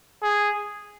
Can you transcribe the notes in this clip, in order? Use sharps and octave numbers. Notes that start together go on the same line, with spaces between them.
G#4